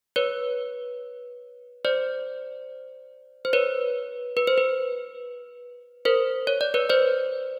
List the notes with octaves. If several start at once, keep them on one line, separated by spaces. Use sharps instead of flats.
B4 C#5
C5 D5
C5
B4 C#5
B4
C5
B4
A#4 C5
C#5
D5
B4 C#5
C5 D5